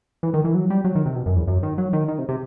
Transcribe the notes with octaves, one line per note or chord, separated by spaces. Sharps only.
E3
D#3
E3
F#3
G3
F#3
D#3
C3
B2
F#2
E2
F#2
D#3
F#3
D#3
D#3
C3
C3